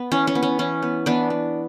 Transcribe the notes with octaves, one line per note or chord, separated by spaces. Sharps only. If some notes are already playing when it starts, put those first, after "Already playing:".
Already playing: B3
E3 C#4
C#4
B3
C#4
E3 C#4
B3
E3 B3 D4
B3